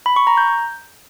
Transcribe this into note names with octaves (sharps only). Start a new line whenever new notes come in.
B5
C#6
A#5
G6